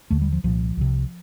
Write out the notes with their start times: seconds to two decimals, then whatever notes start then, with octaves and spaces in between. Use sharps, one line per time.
0.11 D#2 D3 A3
0.22 G3
0.32 F3
0.44 C2 A#2 F3
0.77 C2 C3